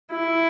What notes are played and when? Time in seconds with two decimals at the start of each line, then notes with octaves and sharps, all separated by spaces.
0.11 E4